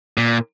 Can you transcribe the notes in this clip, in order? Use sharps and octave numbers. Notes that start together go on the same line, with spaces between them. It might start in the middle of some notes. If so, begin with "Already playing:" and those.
A#2